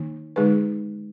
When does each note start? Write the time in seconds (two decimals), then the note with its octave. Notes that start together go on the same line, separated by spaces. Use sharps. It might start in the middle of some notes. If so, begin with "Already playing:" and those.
Already playing: D#3 A#3 D#4
0.36 D3 G#3 D#4 G#4 B4